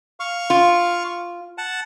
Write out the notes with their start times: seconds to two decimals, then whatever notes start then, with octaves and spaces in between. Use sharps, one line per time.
0.20 F5 C#6
0.50 F4
1.58 F#5 A5